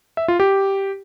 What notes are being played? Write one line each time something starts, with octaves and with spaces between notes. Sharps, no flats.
E5
F4
G4